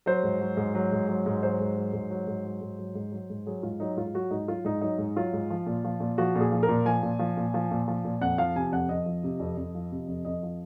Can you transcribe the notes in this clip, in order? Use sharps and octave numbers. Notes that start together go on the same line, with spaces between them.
F#3 C5
G#2
F#3
G#2
F#3
G#2
F#3
G#2
F#3 C5
G#2
F#3
G#2
F#3
G#2
F#3
G#2
F#3
G#2
F#3
G#2
F#3 G#4
G#2 F4
F#3 D#4
G#2 F4
F#3 F#4
G#2 D#4
F#3 F4
G#2 D#4
F#3 D#4
G#2
F#3 F4
G#2
F3
A#2
F3
A#2
F3 F#4
A#2 G#4
F3
A#4
A#2
F3 G#5
A#2
F3
A#2
F3
A#2
F3
A#2
F2 F#5
F3 F5
C3 G#5
F2 F#5
F2 D#5
F3
C3
F2
F2
F3
C3
F2
F2 D#5
F3